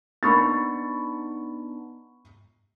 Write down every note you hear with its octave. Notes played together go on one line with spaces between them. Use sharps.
B3 D4 D#4 B5 C#6 A6